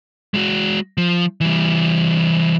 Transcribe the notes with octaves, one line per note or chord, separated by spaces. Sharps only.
G#3 F#4
F3
E3 G3